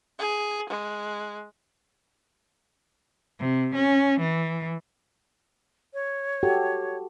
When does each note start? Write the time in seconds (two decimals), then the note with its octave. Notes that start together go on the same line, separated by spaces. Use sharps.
0.19 G#4
0.70 G#3
3.40 C3
3.75 C#4
4.20 E3
5.94 C#5
6.43 F#4 G4 A4